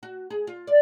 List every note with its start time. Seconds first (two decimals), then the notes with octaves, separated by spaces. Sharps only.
0.03 F#4
0.30 G#4
0.47 F4
0.67 D5